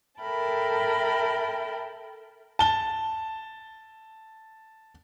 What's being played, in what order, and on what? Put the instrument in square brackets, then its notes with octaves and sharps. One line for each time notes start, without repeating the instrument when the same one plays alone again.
[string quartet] A4 A#4 E5 G5 A5 B5
[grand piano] A5 G7